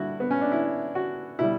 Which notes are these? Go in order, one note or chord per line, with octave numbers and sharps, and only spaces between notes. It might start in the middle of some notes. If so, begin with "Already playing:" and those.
Already playing: G2 D3 G3 E4 F#4
B3
C#4
D4
E4
F#4
B2 G3 E4